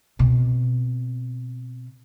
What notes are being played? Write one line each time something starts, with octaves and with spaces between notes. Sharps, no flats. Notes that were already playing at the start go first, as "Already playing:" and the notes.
B2 C4